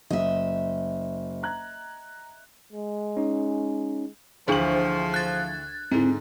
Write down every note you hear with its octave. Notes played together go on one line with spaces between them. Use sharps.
F#1 D#5 E5
A#5 F#6 G#6
G#3
C#4 D#4
D2 E3 F3 D4 G#4 C5 F#7
F#6 G#6 A6
G#2 D3 C4 E4